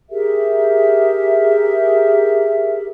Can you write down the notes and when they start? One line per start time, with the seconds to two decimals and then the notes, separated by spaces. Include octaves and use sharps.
0.10 G4 G#4 A#4 E5